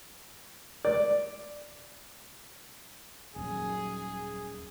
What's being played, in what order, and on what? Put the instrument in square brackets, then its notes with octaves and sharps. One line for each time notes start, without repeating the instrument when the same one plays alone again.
[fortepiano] D5
[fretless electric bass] D#1 F#2 [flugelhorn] G#4